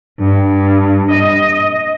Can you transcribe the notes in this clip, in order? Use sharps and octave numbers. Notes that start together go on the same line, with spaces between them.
G2
D#5